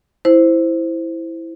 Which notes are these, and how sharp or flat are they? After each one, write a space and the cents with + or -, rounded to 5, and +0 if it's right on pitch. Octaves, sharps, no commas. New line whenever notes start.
E4 +0 C5 -5